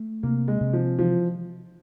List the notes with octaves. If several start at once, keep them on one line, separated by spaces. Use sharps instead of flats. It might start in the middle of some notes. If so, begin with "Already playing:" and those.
Already playing: A3
C3 A#3
G#3
C3
F3
E3 F3